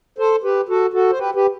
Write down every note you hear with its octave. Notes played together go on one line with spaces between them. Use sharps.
A4 C5
G4 B4
F#4 A4
F#4 A4
C5
G4 B4
G4 B4